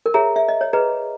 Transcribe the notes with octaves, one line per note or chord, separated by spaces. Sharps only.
A#4
G#4 C#5 E5 A#5
E5
D#5
C#5
G#4 B4 D#5 A#5